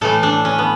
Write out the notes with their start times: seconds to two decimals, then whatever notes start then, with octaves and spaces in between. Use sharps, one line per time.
0.01 A2 E3 A3 A4
0.23 D4
0.45 C#4
0.59 B3